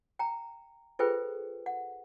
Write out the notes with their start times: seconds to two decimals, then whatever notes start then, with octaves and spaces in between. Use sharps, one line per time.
0.19 G5 A#5
0.99 F4 G#4 A4 B4 C5 G5
1.66 F#5